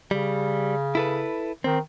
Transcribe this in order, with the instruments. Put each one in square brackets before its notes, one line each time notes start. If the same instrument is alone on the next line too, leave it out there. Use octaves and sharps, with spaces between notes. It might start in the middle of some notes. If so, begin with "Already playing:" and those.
[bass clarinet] C#3 [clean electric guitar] G3
[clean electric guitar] E4 A4 B4
[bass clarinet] D#3 [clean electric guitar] C4